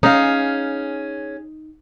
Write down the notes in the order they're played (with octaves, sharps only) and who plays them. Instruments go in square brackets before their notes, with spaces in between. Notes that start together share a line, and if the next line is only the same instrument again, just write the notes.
[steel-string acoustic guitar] C#4 G#4 [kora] D#4 F5